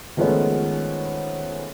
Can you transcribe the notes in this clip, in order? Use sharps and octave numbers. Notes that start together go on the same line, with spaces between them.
D#3 F3 G#3 A3 B3 C#4